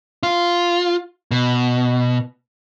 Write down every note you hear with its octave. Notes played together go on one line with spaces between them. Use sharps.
F4
B2